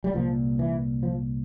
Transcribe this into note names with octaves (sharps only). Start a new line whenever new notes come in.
G3
C2 A#2 F3
E3
F3